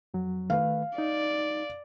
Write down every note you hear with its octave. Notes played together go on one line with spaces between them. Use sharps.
F2 F#3
D#3 A3 B4 F5
D#4 D5